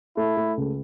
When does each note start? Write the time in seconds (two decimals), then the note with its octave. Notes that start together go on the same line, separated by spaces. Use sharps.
0.17 A3 E4
0.37 A3
0.57 C#2